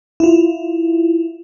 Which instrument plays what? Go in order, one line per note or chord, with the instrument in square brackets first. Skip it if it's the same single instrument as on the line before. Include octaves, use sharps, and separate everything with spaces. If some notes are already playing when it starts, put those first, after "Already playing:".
[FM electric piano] E4 F4